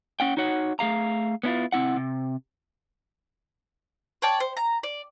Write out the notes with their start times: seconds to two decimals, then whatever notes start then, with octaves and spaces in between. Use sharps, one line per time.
0.20 C#4 F#5 G5
0.37 D#4 F#4 C#5 F#5
0.79 A3 G#4 F5 A#5
1.43 B3 C#4 E4 F4
1.72 C3 C4 E4 F#5
1.96 C3
4.22 C#5 D5 G5 A5
4.40 C5
4.57 A#5
4.83 D5